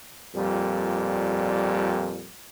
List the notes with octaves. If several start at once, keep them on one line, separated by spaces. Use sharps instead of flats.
F2 A#2 G3